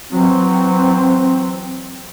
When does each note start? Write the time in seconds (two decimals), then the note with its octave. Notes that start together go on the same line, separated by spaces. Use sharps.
0.11 E3 F#3 C4